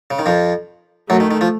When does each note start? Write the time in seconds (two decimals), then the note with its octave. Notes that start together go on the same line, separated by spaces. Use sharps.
0.10 C#3
0.19 D#3
0.26 F2 F3
1.09 F#2 F#3 A3
1.20 D#3
1.31 D#3
1.41 F3